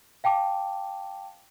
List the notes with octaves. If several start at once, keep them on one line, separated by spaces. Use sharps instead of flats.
F5 G5 A5 D6